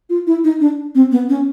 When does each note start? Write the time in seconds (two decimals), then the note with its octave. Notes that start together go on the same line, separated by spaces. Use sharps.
0.10 F4
0.27 E4
0.44 D#4
0.60 D4
0.95 C4
1.12 B3
1.29 C#4